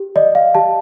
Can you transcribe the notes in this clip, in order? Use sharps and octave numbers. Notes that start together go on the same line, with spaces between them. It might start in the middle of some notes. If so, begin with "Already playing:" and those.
Already playing: G4
D5 D#5
F5
G4 A5